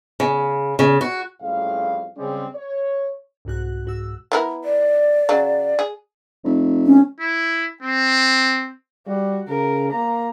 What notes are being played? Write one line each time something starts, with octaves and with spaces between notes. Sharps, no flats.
C#3
C#3
F#4
A1 F2 A2 G3 G#3 F5
C#3 G3 G#3 C4 C#4
C#5
C2 G#2 F#4 F#6
G#2 F#4 E6
B3 E4 A#4
D5
C#3 F#3
G#4
F1
C#4
E4
C4
G3 F#4
C#3 A#4
A#3 A#5